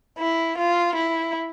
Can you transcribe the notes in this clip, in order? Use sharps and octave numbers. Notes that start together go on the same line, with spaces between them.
E4
F4
E4